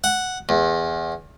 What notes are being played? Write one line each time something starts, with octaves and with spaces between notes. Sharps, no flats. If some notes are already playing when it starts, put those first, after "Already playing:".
F#5
E2